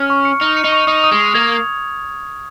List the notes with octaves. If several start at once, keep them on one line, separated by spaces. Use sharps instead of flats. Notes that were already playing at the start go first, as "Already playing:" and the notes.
Already playing: C#4 F6
C#6
C#7
D#4 F6
C#7
D#4
C#6
D#4 D#6
D#6
G#3
F7
A#3 G#6